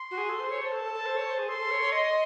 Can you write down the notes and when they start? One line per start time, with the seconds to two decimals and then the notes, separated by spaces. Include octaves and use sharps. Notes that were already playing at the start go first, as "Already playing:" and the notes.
Already playing: C6
0.11 F#4
0.18 G#4
0.29 A4
0.40 C5
0.50 C#5
0.61 C5 A5
0.72 A4
0.84 A4
0.94 A4
1.06 C5
1.17 C#5
1.28 C5
1.39 G#4
1.49 A4 C6
1.60 A4
1.71 C#5
1.81 C#5
1.92 D#5 C6